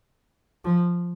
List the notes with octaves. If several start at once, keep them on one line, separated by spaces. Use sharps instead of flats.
F3